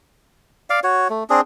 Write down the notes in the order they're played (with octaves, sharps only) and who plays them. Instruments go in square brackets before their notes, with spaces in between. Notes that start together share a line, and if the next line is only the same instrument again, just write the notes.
[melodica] D5 F5
F#4 C#5
A3
C4 D4 G#4